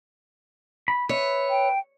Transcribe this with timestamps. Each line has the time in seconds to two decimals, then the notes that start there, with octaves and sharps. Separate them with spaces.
0.88 B5
1.09 B4 C#5 E5
1.50 G5